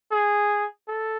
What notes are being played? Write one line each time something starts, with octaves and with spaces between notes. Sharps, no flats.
G#4
A4